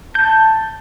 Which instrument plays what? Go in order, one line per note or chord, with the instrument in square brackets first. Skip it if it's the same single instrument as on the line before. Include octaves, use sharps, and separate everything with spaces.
[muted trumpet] A5 [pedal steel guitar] G6